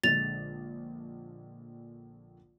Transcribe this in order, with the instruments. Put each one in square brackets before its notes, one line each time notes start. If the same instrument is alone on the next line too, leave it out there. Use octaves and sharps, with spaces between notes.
[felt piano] A#1 D3 G#3 [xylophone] A6 F7